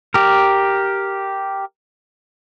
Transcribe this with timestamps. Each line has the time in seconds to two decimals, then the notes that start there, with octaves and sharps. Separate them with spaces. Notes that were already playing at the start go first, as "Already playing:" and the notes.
0.14 G4 A#4